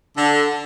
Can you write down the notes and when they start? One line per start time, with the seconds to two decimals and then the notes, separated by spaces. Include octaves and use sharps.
0.16 D3